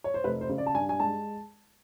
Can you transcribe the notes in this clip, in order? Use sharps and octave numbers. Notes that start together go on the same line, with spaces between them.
C#5
C5
F1 B4
C5
C#3
D5
A5
G2 G#5
G#5
G#3 A5